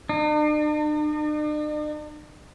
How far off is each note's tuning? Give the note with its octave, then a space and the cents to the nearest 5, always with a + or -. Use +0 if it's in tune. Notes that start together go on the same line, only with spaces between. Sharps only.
D4 +45